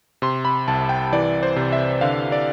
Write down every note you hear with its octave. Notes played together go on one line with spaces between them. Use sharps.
C3 C6
B5
C2 A5
G5
E3 D5
C5
C3
E5
D3 F5
D5